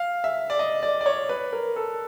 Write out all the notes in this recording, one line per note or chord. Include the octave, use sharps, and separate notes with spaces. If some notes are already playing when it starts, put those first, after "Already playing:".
Already playing: F5
E5
D5
D#5
D5
D5
C#5
B4
A#4
A4